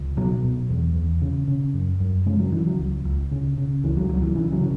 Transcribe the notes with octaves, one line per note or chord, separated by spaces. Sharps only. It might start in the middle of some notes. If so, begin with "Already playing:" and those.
Already playing: C#2
B2 F#3
B2
E2
E2
C#3
C#3
F#2
F#2
C#3 G#3
F#3
C#3 E3
F#3
C#2
C#2
C#3
C#3
C#2 E3
F#3
C#2 F#3
E3
C#3 E3
F#3
C#3